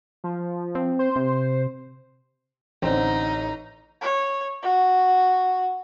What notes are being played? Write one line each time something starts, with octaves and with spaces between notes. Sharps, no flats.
F3
C4
C5
C3
A1 D3 C4 D#4
C#5
F#4